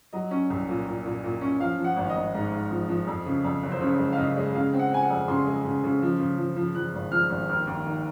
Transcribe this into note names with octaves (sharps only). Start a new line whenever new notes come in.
F#3 D#5
C#4
C2
A#2
A#2
A#2
A#2
C#4
F3 F5
F3
F#5
G#1
D#5
G#1
G#2
G#2
F3
F3
F2
C#3
F2
F#1
C5
C#3 C#5
G#3
F5
C#3 D#5
G#3
C#3 F5
C4
F#5
C4 G#5
F#5
F2
C#3 C6
G#3
C#3
C#3
F3
C#3
F3
F3
F3 F#6
G#1
F3 F6
G#1
D#2 F6
D#2
D#3